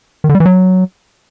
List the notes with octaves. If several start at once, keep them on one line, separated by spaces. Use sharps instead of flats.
D#3
D3
G3
E3
F#3